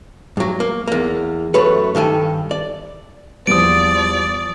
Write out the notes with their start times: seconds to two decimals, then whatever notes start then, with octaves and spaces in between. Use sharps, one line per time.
0.37 G2 F#3
0.60 A#3
0.88 E2 A#3
1.54 F#2 A3 F#4 B4 C#5
1.95 G2 D#3 A4 G#5
2.51 D5
3.47 E2 F3 G3 D5 D#6 D7